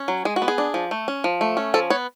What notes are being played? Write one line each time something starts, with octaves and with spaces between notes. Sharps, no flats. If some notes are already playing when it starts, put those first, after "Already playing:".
Already playing: C#4
F#3
G#3 G#4
F#4
B3
G#4
D4
F3
A3
C#4
F3
A3
C#4
F3 A4
B3 C#5